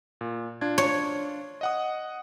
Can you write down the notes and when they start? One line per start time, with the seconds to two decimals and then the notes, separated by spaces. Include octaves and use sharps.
0.21 A#2
0.61 D4 F4 G#6
0.78 C#5
1.61 D#5 F#5 D#6